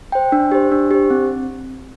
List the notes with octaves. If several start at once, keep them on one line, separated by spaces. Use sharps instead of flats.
C5 G5
D4
G4 C5
D4
G4 C5
C4